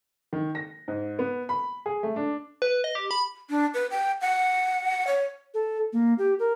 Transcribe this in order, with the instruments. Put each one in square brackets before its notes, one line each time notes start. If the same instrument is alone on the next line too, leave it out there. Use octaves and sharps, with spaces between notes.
[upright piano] D#3
A#6
G#2
B3
B5
G#4
A3
D4
[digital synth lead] B4
D#5
G4
B5
[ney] D4
B4
G5
F#5
C#5
[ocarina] A4
A#3
G4
A#4